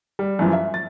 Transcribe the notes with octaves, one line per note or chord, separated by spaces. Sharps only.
G3
F#2 E3 F3
E5
A6